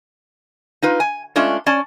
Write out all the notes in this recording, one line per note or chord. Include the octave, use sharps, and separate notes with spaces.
D#4 F4 B4
G#5
G#3 A3 C#4 D4 F4
C#4 D5 A5